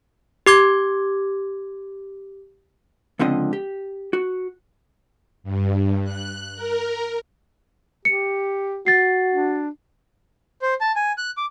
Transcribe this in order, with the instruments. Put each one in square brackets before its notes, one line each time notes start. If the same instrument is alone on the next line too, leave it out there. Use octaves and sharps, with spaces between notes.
[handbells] G4 D6 G#6
[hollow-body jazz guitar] C#2 D3 F3 C4 D#5
G4
F#4
[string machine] G2
F#6
A#4
[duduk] G4 [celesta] C#7
[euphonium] F#4 [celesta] A6 C7
[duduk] D4
[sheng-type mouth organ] C5
A5
G#5
F#6
D6